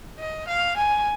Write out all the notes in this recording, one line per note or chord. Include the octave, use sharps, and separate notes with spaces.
D#5
F5
G#5